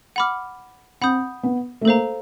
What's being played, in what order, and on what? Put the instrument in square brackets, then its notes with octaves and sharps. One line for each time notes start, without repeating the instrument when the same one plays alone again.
[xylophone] F#5 B5 D6 F6
[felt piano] C4 [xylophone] F#5 B5 D#6 G6
[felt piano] B3
A3
[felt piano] A#3 [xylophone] A4 C5 F5 A#5